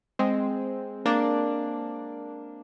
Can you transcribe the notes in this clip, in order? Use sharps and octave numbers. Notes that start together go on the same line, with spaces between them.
G#3 C4
A#3 D4